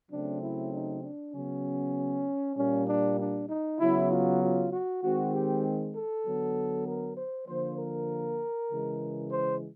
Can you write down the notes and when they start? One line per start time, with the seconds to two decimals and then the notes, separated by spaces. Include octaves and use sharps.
0.11 C#3 F#3 A3 C4 D4
0.42 E4
0.72 D#4
1.03 D4
1.33 C#3 F#3 B3 C#4
2.56 A#2 G3 A#3 C#4
2.87 D4
3.18 D4
3.48 D#4
3.79 C#3 F#3 B3 E4
4.10 F4
4.40 F4
4.71 F#4
5.02 D#3 G#3 C4 F#4
5.32 G4
5.93 A4
6.25 D3 F#3 B3
6.86 A#4
7.16 C5
7.47 D3 F3 A#3 C5
7.77 A#4
8.70 C#3 E3 G#3
9.31 C5